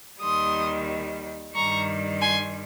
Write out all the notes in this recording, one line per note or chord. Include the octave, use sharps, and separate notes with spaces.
D#2 D#3 G3 C6 D#6
G2 D#3 G3 A#5 C#6
G#5 C6